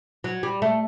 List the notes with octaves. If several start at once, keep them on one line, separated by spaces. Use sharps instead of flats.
F#3
G3
A3